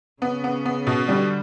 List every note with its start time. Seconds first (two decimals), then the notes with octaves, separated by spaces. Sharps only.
0.22 C#3 B3
0.44 B3
0.65 B3
0.87 B2
1.09 D3 G3